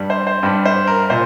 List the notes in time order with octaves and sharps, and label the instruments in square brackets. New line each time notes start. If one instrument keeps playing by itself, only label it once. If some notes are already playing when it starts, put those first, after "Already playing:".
Already playing: [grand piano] G2 G3
C5
C5
G2 G3 G4
C5
A#4
A#2 C5